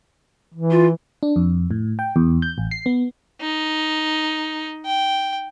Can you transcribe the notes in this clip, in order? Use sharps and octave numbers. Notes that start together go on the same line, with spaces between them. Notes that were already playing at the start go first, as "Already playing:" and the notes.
E3
F4
D4
F2
A2
G5
E2
G6
A1
C7
B3
D#4
G5